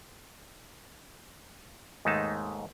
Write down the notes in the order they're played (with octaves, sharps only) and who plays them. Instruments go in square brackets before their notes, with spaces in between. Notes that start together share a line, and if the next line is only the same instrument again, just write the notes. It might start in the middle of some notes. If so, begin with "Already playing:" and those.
[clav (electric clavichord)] D#2 G#2 G#3 A3 D#4 A5